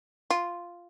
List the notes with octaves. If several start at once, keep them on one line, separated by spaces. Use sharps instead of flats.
F4